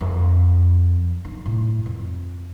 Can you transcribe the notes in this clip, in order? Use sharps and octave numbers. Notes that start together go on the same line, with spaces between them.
F2
D#4
A2
F2